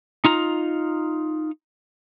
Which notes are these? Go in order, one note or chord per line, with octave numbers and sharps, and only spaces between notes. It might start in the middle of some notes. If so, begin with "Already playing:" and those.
D#4 F4 A#5